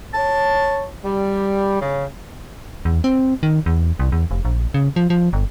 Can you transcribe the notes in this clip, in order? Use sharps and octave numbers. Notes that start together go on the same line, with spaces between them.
C#5 A5
G3
C#3
E2
C4
D#3
E2
C2
E2
F1
A#1
C#3
F3
F3
G1